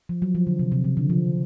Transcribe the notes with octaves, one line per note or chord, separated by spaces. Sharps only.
F3
F#3
F3
D3
C3
C3
C#3
D3
F3